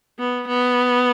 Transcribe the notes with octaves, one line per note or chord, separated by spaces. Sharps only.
B3
B3